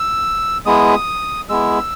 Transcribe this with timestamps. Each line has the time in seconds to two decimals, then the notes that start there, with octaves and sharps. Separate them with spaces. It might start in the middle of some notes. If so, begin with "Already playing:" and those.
Already playing: E6
0.66 G#3 B3 E4 D#6
1.49 G#3 B3 E4 E6